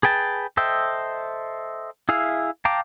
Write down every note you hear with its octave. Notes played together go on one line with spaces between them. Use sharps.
G#4 B4 G5 A5
A4 C5 D#5 E5 G5
E4 G#4 E5 F5
F5 G5 A5 A#5 D6